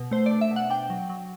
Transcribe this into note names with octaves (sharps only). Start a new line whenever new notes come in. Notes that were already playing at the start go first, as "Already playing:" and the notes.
Already playing: B2
A3 C5
D4 D5
E5
B2
F#5
D4 G5
F#3
F#3